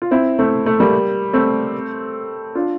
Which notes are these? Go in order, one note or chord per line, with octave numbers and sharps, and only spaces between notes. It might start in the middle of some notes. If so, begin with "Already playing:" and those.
F4
C4 E4
A3 C4
A3
G3 A#3
A3 C4
D4 F4